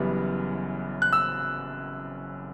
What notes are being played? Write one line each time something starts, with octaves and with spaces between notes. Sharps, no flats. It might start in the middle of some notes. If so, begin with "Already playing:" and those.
Already playing: F#1 F#2 E3 G3 B3
F#6
E6